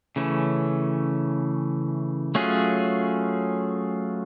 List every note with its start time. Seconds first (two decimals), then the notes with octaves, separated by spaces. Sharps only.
0.16 C#3 E3 A3 C#4
2.35 F#3 A3 C#4 F4 G#4